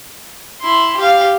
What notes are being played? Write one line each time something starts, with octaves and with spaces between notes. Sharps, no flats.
E4 C6
G4 F5